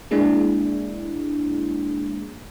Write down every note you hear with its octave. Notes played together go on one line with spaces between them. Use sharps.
G#3 A#3 D4 E4 G#4